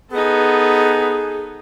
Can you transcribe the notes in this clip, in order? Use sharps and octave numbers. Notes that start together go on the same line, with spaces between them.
B3 D#4 G#4 A4